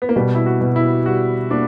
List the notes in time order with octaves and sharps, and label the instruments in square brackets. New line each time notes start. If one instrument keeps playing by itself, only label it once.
[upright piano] B3
A#3
[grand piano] B2 [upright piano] G3
[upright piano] E4
F#4
[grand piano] B2
[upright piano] E4
[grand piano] G3 [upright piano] F#4
[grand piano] A#3 [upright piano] D4